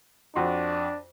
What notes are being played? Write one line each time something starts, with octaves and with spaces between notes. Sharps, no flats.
F2 D4 F#4 C6